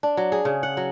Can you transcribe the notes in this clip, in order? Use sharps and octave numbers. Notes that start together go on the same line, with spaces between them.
D4
F#3
G#4
C#3
F#5
F#3